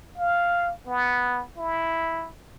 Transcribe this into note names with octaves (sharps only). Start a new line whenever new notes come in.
F5
B3
E4